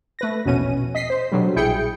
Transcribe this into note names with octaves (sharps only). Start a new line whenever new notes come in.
A3 B4 A#6
A#1 E2 B2 C#4 D#7
D#5 B6 C7
C5
B2 D3 F#3 G3
A#1 E4 G#4 G5 G6 C#7